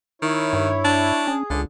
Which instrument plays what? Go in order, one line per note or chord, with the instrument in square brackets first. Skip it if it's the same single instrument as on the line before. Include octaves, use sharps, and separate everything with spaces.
[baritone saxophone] D#3 [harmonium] E4 C#5
[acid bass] G2
[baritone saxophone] D4
[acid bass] C#4 [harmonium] G#4
[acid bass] C#2 [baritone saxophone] D3